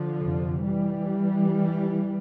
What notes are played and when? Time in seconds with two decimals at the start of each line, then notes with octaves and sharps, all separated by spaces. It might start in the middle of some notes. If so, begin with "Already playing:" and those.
Already playing: D3 F3
0.17 F2 C3
0.64 E3 G3